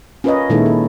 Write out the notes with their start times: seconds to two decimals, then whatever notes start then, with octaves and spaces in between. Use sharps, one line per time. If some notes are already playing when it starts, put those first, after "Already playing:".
0.24 C#4 F4 A#4 B4 C#5 D#5
0.50 A#2 D#3 G#3 D#4 E4 A4
0.66 A4